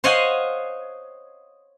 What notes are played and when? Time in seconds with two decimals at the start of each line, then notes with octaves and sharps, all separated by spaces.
0.04 C5 C#5 D#5 F5 F#5 G#5